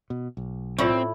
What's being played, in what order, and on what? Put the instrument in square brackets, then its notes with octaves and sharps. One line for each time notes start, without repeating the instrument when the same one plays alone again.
[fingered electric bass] B2
B1
[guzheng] A2 E4 [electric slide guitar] C4 [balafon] F4 D5 C#6